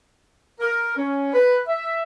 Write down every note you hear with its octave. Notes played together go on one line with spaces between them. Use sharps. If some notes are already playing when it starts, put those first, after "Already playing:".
A#4
C#4
B4
E5